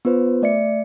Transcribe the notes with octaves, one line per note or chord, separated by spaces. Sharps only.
B3 F4 B4 C5
A3 D5 E5 C#7